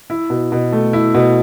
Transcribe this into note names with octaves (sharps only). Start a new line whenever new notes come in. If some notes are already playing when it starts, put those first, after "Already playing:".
E4
B2
B2
A3
E4
B2